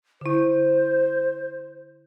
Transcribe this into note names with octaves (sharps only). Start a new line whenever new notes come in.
D3 E4 C5